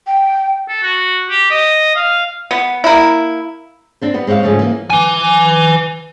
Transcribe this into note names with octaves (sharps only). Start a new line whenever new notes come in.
G5
A4
F#4
G4
D#5
F5
B3
A#3 E4
C4 D4 C5
G3 B3
G#3 C4 C#5 D#5 F5
G#2 C#3 F3 A3 G#4
E3 A#3
B4 G#5